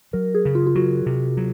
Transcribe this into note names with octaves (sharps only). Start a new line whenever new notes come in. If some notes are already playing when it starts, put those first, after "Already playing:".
F#3 A#4
G#4
C#3
F4
F4
F#3 F#4
C3
F#3